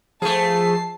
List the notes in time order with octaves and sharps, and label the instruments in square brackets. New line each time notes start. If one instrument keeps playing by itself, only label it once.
[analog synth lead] F3 [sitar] A3 G#4 [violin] A5 C7